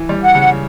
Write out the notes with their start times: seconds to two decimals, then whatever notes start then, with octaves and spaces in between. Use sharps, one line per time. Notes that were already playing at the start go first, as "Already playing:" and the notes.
Already playing: E3
0.09 G3
0.22 F#5
0.35 C#3